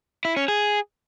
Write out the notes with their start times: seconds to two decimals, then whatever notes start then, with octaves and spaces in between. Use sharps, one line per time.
0.25 E4
0.37 C#4
0.48 G#4